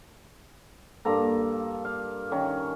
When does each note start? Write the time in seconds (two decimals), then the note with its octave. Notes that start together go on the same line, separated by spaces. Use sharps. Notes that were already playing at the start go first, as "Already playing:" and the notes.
1.05 G2 A#3 A4 A#5
1.85 F5
2.32 D#3 C#4 D#4